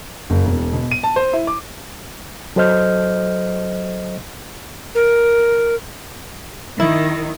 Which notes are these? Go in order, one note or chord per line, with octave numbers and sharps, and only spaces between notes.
F#1
E1
B2
D#7
A5
C5
E4
D6
F#3 A4 C5 D#5 F6 G6
A#4
D#3 E4